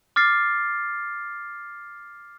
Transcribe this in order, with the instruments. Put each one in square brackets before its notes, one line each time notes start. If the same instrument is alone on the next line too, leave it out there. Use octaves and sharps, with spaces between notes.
[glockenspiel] D6 F6 A6 C7